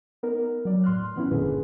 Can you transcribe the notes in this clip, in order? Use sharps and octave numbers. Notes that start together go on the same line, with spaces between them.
B3 D#4 A#4
F#3 D5
A2 C6 F6 F#6
E3 B3 C#4 E4
G1 A#2 D3 G#4 B4